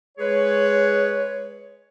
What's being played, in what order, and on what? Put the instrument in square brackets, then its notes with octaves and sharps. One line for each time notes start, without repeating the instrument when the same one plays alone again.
[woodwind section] G#3 G#4 B4 C#5